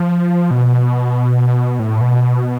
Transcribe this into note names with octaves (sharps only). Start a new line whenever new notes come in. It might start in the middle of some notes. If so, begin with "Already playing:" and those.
Already playing: F3
B2
A2
B2